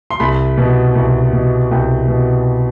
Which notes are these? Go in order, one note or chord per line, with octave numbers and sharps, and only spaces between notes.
C6
C2 B5
B2
C2
B2
C2 G5
B2